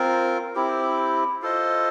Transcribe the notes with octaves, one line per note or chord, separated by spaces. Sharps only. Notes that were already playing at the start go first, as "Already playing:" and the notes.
Already playing: C4 F4 A#4
C4 E4 G4
F4 A4 C5 D#5